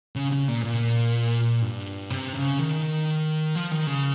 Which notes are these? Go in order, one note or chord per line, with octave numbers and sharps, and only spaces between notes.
C#3
C#3
A#2
A#2
G2
C3
C#3
D#3
F3
D#3
C#3